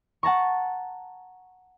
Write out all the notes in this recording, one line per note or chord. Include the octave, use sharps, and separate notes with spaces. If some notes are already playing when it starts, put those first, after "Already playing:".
F#5 A5 A#5 C#6